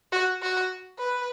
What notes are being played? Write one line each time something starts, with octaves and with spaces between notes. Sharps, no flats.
F#4
F#4
B4